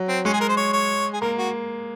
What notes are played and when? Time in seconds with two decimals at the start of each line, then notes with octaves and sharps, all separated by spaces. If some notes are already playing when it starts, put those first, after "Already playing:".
Already playing: F#3
0.09 C4
0.25 G#3 C#4
0.33 G#4
0.41 A#4
0.49 C5
0.57 C#5
0.73 C#5
1.13 G#4
1.21 A#3 A#4
1.38 F#4